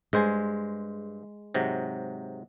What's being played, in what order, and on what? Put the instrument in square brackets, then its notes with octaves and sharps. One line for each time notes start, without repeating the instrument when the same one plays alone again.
[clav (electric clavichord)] G2 C5 G#5 [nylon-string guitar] G#3
[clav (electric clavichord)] G#2 C3 F#3